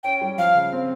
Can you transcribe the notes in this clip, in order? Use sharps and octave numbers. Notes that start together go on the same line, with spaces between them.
C#4 G5
G3
F3 F5
C#3
C4